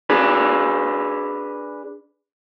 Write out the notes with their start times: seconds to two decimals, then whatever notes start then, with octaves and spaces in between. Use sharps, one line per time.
0.10 D4 G#4 B4